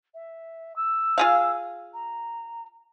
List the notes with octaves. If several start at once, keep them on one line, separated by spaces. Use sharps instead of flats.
E5
E6
F4 G#4 F5
A#5